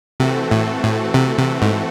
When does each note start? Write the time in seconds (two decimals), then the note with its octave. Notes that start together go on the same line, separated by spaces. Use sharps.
0.20 C3 E3 A3 C4 F#4 A4
0.51 A2
0.83 A2
1.14 C3
1.38 C3
1.62 G#2